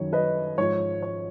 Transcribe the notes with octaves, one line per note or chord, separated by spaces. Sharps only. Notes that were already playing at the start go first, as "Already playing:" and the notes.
Already playing: F#2 D#3 C#5
B4 D#5
G#2 F3 C#5
C#5